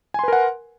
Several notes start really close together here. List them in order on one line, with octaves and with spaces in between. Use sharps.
G#5 C6 B4 A#4 F#5